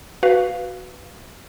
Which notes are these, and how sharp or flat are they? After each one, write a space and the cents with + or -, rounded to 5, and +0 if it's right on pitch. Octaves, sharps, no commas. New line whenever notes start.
F#4 +0 B4 +0 F5 +0